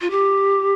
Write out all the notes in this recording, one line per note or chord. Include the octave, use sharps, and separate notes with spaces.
F4
G4